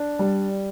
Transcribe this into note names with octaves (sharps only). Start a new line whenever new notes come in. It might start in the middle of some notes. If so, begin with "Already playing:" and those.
Already playing: D4
G3